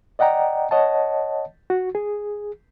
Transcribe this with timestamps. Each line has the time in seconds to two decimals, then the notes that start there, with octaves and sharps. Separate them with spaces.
0.19 D5 D#5 F#5 G5 A#5
0.71 C#5 D#5 F#5 A5
1.70 F#4
1.95 G#4